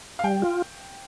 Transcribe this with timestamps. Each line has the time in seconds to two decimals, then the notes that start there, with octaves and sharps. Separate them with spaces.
0.19 F5
0.24 G3 G5
0.42 F4